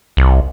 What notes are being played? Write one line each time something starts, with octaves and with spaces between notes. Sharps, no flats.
C2